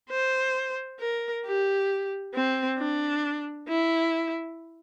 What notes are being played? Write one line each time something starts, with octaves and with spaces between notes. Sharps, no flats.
C5
A#4
G4
C4
D4
E4